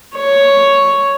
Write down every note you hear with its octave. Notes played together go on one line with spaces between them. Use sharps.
C#5